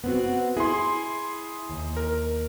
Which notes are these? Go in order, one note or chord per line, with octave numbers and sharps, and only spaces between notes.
B3 C4 F#4
E4 G#4 C6
D#2
A#4